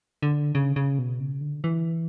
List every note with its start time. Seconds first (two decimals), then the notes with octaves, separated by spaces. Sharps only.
0.22 D3
0.55 C#3
0.76 C#3
0.99 B2
1.20 C#3
1.41 D3
1.64 E3